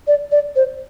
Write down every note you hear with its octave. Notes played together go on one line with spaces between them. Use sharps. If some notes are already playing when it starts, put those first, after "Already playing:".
D5
D5
C5